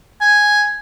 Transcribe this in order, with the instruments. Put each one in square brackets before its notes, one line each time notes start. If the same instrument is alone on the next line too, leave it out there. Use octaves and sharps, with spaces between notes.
[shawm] G#5